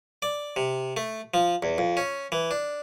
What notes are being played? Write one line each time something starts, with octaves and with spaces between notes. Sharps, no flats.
D5
C3
A3
F3
E2
F2
C#4
E3
D4